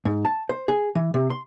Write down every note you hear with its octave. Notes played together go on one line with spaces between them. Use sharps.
G#2
A5
C5
G#4
E3
C3
C6